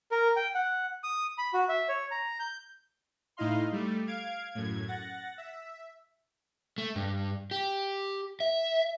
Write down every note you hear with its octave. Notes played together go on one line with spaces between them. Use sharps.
A#4
G5
F#5
D#6
B5
F#4
E5
C#5
A#5
G6
A2 D#4 E4 D#5 F5 C6
G3 A3
F5 G#6 D7
F#2 A2 G#6
F#5 A6 A#6
E5
A3
G2
G4
E5